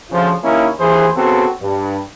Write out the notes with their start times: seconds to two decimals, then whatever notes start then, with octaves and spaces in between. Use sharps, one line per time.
0.11 D2 C#3 F3
0.43 D#2 A#3 C#4 D#4 E4
0.79 D#2 E3 G#4 B4 C5
1.16 C#3 B3 C4 F#4 A4
1.61 G2